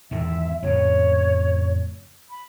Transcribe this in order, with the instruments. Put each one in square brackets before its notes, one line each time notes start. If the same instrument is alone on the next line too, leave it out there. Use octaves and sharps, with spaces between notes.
[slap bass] E2 G#2 D#3 [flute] E5
[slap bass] F2 A2 C#3 [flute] C#5
[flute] B5